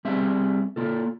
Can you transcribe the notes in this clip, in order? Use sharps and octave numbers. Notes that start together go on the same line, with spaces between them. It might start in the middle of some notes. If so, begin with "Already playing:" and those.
G3 C4 G#4 E5
A#3 F4 A4